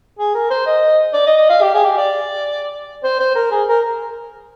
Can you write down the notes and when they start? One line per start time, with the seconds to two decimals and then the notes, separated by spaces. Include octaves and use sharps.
0.19 G#4
0.35 A#4
0.50 C5
0.66 D#5
1.13 D5
1.26 D#5
1.37 D#5
1.49 F5
1.61 G4
1.74 G#4
1.85 G4
1.97 D5
3.04 C5
3.19 C5
3.35 A#4
3.51 G#4
3.68 A#4